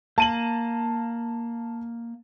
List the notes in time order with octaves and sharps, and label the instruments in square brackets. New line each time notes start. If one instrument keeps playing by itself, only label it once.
[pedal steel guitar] A#3 [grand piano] A5 D#7 F#7